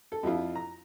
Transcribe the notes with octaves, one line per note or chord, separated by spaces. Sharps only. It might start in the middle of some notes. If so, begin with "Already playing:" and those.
A4
F2 F3 E4 F4
A#5